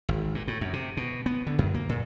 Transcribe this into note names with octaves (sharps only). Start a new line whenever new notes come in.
G#1
A#2
A2
F#2
C3
B2
B3
D3
F#2
A#3
A#2